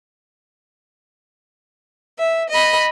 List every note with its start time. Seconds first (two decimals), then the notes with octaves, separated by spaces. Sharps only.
2.19 E5
2.50 D#5 B5